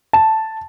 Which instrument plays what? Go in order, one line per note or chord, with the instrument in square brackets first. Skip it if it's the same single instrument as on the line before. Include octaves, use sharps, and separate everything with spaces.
[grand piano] A5